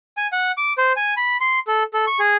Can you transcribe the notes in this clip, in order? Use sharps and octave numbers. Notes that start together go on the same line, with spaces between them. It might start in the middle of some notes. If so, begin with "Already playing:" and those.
G#5
F#5
D6
C5
G#5
B5
C6
A4
A4
C#6
G#4